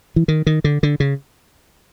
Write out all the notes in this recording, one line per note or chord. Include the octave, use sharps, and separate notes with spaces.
E3
D#3
D#3
D3
D3
C#3